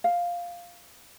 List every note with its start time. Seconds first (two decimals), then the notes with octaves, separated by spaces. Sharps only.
0.04 F5